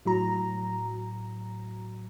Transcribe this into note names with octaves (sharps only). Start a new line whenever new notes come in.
A2 F#3 A#5